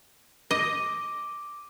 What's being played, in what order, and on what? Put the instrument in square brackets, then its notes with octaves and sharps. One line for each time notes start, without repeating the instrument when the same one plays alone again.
[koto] D#5 [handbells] D6